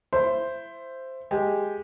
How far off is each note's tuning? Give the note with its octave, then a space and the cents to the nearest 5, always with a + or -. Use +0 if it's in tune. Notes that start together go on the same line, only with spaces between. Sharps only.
E4 +20 C5 +0 C6 +0
G#3 +0 G4 +0